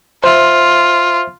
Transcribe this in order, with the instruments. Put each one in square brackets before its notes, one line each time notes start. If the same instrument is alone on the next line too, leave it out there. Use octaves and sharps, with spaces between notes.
[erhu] F4 [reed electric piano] C5 E5